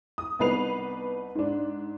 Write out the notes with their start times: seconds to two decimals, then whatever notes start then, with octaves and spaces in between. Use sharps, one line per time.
0.18 D#6
0.39 C2 B3 D#4 B4 C7 F7
1.35 G#2 D4